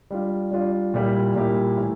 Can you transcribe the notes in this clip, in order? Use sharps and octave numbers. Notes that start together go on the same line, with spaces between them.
G3 D4 F4
G3 D4 F4
A#2 G3 A#3 E4 G4
A#2 G3 A#3 E4 G4
A2 E3